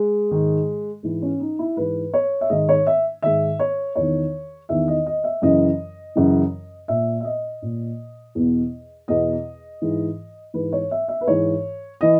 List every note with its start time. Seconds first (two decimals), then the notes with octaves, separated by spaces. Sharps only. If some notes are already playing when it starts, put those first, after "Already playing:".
Already playing: G#3
0.31 G#2 D#3
1.03 G#2 E3
1.22 C#4
1.40 D#4
1.59 E4
1.76 G#2 E3 B4
2.14 C#5
2.41 E5
2.49 G#2 D#3 D#5
2.69 C#5
2.87 E5
3.22 G#2 D#3 E5
3.59 C#5
3.96 E2 D#3 C#5
4.69 E2 D#3 E5
4.88 D#5
5.06 D#5
5.24 E5
5.42 F#2 C#3 E3 D#5
6.15 F#2 C#3 E3
6.88 A#2 E5
7.20 E5
7.25 D#5
7.62 A#2
8.35 E2 B2
9.08 E2 B2 D#5
9.82 G#2 E3
10.54 G#2 E3 B4
10.73 C#5
10.91 E5
11.08 E5
11.21 B4
11.27 G#2 E3 C#5
12.01 E3 D#5